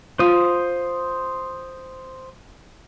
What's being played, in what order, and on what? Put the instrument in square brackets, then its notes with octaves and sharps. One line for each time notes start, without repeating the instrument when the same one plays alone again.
[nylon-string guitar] F4 [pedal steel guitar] C5 D#6